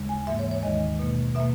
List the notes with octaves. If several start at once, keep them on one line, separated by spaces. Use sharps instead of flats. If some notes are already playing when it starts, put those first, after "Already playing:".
Already playing: D#2 C#3 G#3
G#5
G#2 E3 A#3 E5
C#5
C#5
D#2 D#3 G#3 D#5
B2 A#3
B2 A#3 E5